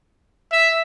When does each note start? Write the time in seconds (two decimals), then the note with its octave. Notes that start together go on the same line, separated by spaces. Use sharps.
0.52 E5